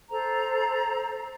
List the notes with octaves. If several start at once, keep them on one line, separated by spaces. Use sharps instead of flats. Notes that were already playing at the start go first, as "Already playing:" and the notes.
A4 C5 A#5